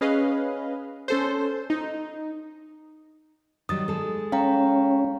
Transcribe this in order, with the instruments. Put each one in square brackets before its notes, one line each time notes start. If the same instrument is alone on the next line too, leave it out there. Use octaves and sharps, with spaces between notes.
[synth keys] C#4 G#4 B4 D#5 F5
C#4 A4 C5
D#4
[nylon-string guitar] D#3 F#3 G3 [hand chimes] D#6 A6
[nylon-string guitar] G#3 A4
[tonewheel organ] C#4 [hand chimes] F5 G5 A#5